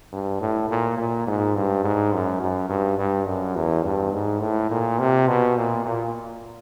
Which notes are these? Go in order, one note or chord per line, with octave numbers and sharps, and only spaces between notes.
G2
A2
A#2
A#2
G#2
G2
G#2
F#2
F#2
G2
G2
F#2
E2
G2
G#2
A2
A#2
C3
B2
A#2
A#2